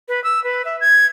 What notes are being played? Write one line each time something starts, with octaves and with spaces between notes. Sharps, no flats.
B4
E6
B4
E5
G#6